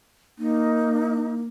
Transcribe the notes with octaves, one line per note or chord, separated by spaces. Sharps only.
A#3 D#4